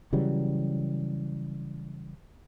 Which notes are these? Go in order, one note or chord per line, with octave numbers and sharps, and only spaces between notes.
C#3 E3 F#3 G3